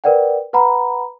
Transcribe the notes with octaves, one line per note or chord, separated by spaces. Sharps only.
A#4 B4 D5 F#5 G5
B4 F#5 A#5 B5